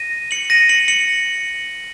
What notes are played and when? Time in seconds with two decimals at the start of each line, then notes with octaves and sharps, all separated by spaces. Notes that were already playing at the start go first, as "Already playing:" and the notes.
Already playing: A#6 D#7
0.31 C#7 F#7
0.50 A#6 D#7
0.69 C#7 F#7
0.88 C#7 F#7